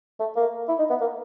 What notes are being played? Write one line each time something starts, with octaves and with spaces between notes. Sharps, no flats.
A3
A#3
E4
D#4
B3
A#3